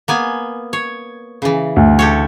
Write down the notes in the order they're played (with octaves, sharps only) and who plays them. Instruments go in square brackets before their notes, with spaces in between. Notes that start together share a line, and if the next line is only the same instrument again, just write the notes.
[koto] A#3 B3 G#5
C#5
C#3 E3
[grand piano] D2
[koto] G4 A4 C#5